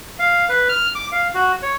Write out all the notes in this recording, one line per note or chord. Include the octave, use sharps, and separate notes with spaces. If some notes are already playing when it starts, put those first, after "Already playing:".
F5
B4
F6
D6
F5
F#4
C#5